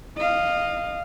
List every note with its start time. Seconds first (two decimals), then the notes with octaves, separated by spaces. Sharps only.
0.17 D#5 F5